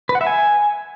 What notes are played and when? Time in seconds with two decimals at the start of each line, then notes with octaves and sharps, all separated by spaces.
0.09 B4
0.15 F#5
0.21 E5
0.27 G#5